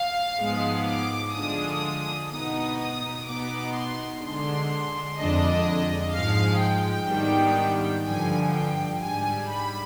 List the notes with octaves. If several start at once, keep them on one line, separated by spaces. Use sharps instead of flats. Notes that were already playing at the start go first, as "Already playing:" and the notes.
Already playing: F5
G#2 F3 G#3 B3
D6
D3 F3 G#3 D4 D#6
B2 B3 D#4 D#6
D#6
B2 B3 D#4 D6
C6
D3 G#3 D4 C6
F2 D3 G#3 D4 D#5
G#2 F3 G#3 F5
G5
G#2 D#3 G3 B3 D4
G2 D3 F3 G#5
G5
G#2 G3 D4 G#5
B5